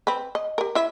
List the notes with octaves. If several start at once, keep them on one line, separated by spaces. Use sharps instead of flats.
C4 B4
D#5
G4 A#4
E4 E5